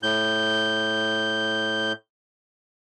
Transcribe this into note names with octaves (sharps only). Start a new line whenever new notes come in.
A2 G6